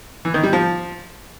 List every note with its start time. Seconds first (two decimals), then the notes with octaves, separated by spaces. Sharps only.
0.25 E3
0.34 D#3
0.43 G3
0.53 F3